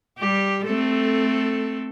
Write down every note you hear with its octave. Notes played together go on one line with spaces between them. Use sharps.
G3 G4
A3 C4 A4